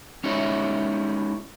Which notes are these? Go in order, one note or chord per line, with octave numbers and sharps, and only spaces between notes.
G#3 C#4 D#4 E4 G4 C#5